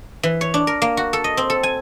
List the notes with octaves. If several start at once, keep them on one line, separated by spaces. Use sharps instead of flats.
E3
C#5
D4
A#4
A#3
F#4
A4
D#5
C4
A4
G#5